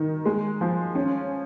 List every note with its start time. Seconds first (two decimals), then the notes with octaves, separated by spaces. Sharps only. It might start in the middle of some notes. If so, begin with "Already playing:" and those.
Already playing: D#3
0.26 G#3
0.61 F3
0.95 C#4